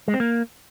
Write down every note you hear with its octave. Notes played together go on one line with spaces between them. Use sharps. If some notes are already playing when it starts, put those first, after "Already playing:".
G#3
C4
A#3